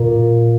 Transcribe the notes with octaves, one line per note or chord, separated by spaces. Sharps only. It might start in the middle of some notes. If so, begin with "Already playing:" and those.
Already playing: A#2